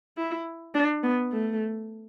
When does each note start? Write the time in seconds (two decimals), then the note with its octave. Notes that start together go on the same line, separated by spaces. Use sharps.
0.18 E4
0.74 D4
1.04 B3
1.32 A3